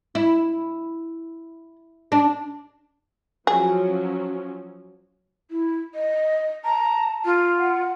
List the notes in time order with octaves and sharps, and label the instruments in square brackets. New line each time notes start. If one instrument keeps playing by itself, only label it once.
[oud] E4
D4
[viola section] F3 F#3 C#4 [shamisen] G#4
[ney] E4
D#5
[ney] A5 [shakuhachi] A#5
[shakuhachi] F4
[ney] F#5